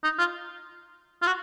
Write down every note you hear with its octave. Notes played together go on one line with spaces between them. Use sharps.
D#4
F4
F4
F#4